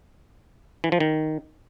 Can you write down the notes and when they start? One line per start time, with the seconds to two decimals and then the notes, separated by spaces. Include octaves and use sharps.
0.84 E3
0.92 F3
1.00 D#3